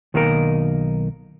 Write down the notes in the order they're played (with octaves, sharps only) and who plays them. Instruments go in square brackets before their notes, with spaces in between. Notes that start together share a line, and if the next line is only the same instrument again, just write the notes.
[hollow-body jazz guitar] B1 D#3 A#3 D#4 A#4